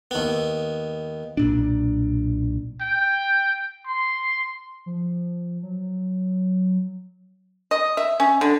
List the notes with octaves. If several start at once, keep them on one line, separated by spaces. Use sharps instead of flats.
D#2 B3
B1 A#2 D4
G5
C6
F3
F#3
D#5
E5
C#4
D3